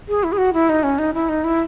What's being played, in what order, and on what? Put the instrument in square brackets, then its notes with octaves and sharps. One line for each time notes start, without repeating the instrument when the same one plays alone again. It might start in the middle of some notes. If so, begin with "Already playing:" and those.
[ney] G#4
E4
G#4
F#4
E4
D#4
C#4
D#4
E4
D#4
E4